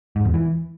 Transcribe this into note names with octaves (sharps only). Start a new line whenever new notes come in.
G#2
E2
E3